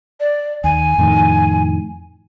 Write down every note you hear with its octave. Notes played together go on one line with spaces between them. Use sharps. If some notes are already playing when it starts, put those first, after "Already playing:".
D5
D#2 G#5
F2 A2 D#3